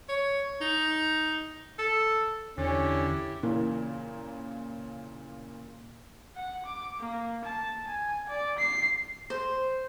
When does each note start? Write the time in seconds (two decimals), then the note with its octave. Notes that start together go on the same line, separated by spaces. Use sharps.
0.09 C#5
0.61 D#4
1.79 A4
2.58 E2 D3 C#4 E4 G4
3.43 A#2 C#3 E3 A#3
6.36 F#5
6.66 D6
6.99 A#3
7.45 A5
7.87 G#5
8.29 D5
8.58 C7
9.30 C5